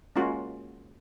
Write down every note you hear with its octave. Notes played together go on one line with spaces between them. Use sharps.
G#3 A#3 C#4 F4 F#4